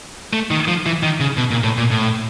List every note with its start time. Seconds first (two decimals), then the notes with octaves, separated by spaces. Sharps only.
0.33 A3
0.51 D#3
0.68 F3
0.86 E3
1.03 D#3
1.20 C#3
1.37 B2
1.51 A#2
1.63 A2
1.77 A#2
1.91 A2